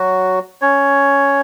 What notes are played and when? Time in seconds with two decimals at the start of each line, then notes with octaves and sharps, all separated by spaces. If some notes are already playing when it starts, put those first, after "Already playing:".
Already playing: F#3 F#4
0.62 C#4 C#5